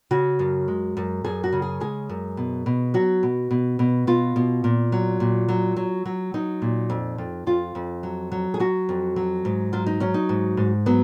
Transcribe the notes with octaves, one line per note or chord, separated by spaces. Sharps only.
C#3 F#4
F#2
G#3
F#2
F#2 G#4
F#4
C#3
G#4
G#3 G#4
F#2
B2
B2
F#3 F#4
B2
B2
B2
B2 F4
B2
A#2
F#3
A#2
F#3
F#3
F#3
F#3 D#4
A#2
F2
F2
F2 F4
F2
F#3
F#3
G#4
F#3 F#4
F2
F#3
G#2
F#3 F4
D#4
F#3 C#4
D#4
G#2
G#2
F#3 B3